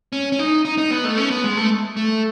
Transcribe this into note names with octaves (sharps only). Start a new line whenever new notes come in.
C#4
C#4
D#4
D#4
D#4
B3
A3
C#4
B3
G#3
A3
A3